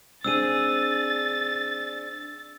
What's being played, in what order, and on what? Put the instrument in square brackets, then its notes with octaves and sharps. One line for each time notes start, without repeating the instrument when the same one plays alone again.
[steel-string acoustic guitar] C4 D4 G#4 [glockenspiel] E6 D#7 [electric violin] A6